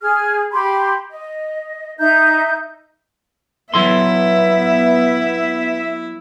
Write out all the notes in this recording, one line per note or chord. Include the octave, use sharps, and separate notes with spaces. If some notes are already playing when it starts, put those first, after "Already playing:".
G#4 F6
G4 B5 C6
D#5
D#4 E5 G6
F#3 B3 E4 A4 E5 C6